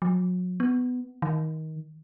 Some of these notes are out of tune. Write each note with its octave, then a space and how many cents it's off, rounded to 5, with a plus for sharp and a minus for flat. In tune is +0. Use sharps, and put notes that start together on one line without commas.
F#3 -35
B3 +15
D#3 +20